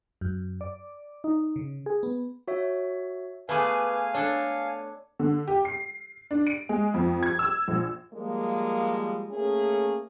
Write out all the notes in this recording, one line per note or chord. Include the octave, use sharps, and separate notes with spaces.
F#2
D5
D#4
C#3
G#4
B3
F#4 C#5 E5
A3 B3 G#4 B4 F5 G#5 D6
D4 A4 C#5
D3
G4
C7
D4
D7
G#3
F2
G#6
E6
A#1
F3 G3 G#3 A#3
A3 A#3 C#4 G#4